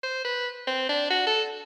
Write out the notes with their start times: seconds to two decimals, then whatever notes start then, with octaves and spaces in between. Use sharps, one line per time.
0.03 C5
0.25 B4
0.67 C4
0.89 D4
1.10 F#4
1.27 A4